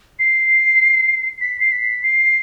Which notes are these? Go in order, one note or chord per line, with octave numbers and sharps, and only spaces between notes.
C7
B6
C7
B6
C7